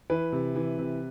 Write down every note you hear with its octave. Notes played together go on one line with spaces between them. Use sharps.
E3 B4
C3
E3
C3